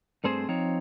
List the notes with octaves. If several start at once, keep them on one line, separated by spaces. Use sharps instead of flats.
G2 A3 C4 G#4 C5
F3 C4 D#4 C#5